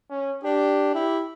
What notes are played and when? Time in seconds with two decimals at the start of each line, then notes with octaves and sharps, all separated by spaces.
0.10 C#4
0.44 D4 G4
0.94 E4 G4